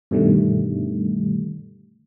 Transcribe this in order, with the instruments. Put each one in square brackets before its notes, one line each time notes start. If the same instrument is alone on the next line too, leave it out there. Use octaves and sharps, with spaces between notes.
[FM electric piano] G2 B2 D3 D#3 G3 A3